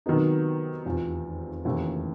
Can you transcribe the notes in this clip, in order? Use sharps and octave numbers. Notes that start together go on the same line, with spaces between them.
C3 D#3 F#3 B3 D#4
F1 E2 C3 F3
F1 D#2 C#3 E3 A3